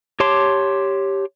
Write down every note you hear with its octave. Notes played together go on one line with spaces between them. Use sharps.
G4 C#5 A5 C6 D6